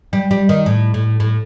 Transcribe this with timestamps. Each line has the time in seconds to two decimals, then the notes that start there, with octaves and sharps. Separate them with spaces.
0.13 G3
0.31 G3
0.49 D#3
0.66 A2
0.94 A2
1.20 A2